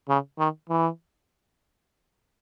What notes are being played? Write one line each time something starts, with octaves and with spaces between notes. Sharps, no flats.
C#3
D#3
E3